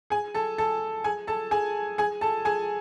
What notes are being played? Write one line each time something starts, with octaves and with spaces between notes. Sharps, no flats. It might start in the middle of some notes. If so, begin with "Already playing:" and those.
G#4 G#5
A4 A5
A4 A5
G#4 G#5
A4 A5
G#4 G#5
G#4 G#5
A4 A5
G#4 G#5